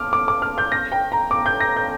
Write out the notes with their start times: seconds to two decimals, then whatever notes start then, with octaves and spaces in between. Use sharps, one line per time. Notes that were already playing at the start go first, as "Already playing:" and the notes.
Already playing: D6 F6
0.13 D6
0.28 D6
0.42 F6
0.58 G6
0.72 A#6
0.92 G5
1.12 A#5
1.31 D6
1.46 G6
1.60 A#6
1.76 G6